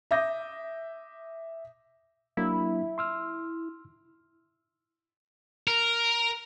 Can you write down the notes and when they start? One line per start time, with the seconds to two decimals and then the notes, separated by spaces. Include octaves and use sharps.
0.11 E5 D6 D#6 G6 A#6
2.37 F#3 A#3 D4 E4
2.98 C6 E6 F6
5.68 A#4